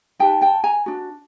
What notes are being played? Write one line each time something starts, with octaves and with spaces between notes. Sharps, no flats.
D#4 G4 B4 G5 A5
G5 A5
G#5 A#5
D4 F#4